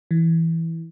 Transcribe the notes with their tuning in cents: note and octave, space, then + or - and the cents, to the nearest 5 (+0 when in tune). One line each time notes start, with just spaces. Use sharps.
E3 -5